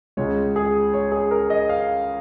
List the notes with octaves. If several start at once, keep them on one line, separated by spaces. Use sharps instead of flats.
C#2 C#3 G#3 C#5
G#4
C#5
G#4
A#4
D#5
F5